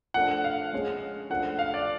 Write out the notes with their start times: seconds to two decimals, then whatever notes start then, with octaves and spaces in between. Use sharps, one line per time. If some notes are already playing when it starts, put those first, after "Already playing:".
0.14 F3 A3 D4 F#5
0.44 F5
0.73 G#3 C#4 G#4 C#5
1.30 F3 A3 D4 F#5
1.59 F5
1.74 D5